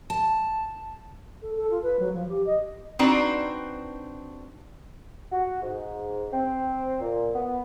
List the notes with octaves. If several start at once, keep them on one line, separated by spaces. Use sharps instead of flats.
A5
A4
A4
F4
B4
F#3
F3
G4
D#5
C4 D4 D#4 F#4 B4
F#4
G#2
C4
A#2
B3